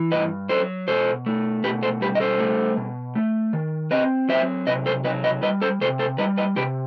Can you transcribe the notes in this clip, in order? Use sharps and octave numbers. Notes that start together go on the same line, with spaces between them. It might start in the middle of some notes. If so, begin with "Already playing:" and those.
Already playing: E3
G2 B4 D#5
F#3 A4 C5
B2 A4 C5
A3
B2 G4 B4
A4 C5
G3 G4 B4
D#5
A4 C5
A3
B2
A3
D#3
C4 B4 D#5
F#3 C5 E5
C3 B4 D#5
A4 C5
F#3 B4 D#5
B4 D#5
G3 B4 D#5
A4 C5
C3 A4 C5
A4 C5
G3 B4 D#5
B4 D#5
C3 G4 B4